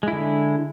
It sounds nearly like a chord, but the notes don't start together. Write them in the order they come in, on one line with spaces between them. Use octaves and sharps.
G#3 E4 D3